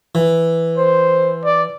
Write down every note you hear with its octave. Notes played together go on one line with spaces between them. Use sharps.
E3
C5
D5